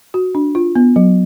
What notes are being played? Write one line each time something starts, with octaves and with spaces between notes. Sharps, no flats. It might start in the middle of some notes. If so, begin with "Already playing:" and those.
F#4
D4
F4
B3
F#3